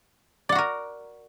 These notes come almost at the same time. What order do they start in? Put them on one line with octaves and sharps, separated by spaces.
D5 F#5 F#4 A#4